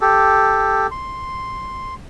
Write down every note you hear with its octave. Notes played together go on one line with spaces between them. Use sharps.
G4 A4
C6